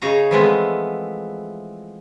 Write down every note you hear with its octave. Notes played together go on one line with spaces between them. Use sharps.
C#3 D#4 G#4 C#5 A#5
E3 F3 G#3 A3 B3 C4